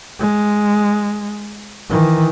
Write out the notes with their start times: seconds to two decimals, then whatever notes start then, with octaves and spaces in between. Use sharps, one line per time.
0.19 G#3
1.89 D#3 E3